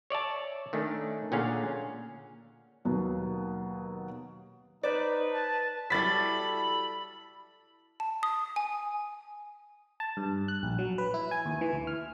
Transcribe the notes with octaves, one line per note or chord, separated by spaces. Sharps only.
C#5 D5 E5 A5
D#3 A3 C#4 D4
A#2 D3 C#4 G#4 F5 F#5
D#2 B2 F#3 B3
D#4 B4 C5 D5
A5
F#3 G3 E4 A4 B5 A6 B6
A5
D#6
G#5
A5
G2
F#6
A#1
F#3
B4
E4
G#5
D#2
E3
D2
F6